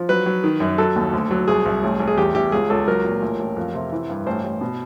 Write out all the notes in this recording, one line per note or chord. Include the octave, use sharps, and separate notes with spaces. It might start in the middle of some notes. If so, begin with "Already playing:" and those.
Already playing: F3
F#3 B4
F#3
D#3
F#2
F#3 A4
D#2
D2
F#3
C2 G#4
C2
A1
A1
G#4
E2 G4
E2 G4
C#2 G#4
C#2 A4
F#3 A#4
A#2
A1
A1
F2
C3
E3
G2
A1 C5
A1
B2